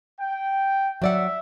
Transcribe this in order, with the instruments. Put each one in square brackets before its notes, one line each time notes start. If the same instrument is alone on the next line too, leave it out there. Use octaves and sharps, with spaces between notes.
[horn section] G5
[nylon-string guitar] F#3 D5 F#5 [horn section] E5